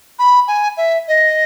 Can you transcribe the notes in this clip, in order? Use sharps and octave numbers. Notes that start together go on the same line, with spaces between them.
B5
G#5
E5
D#5